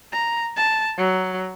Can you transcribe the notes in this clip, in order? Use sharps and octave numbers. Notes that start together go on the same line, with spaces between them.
A#5
A5
F#3